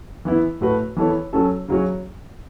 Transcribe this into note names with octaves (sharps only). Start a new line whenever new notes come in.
E3 B3 E4
A2 A3 F#4 B4
E3 B3 A4 C#5
F#3 C#4 A4
C#3 F#3 C#4 F#4 C#5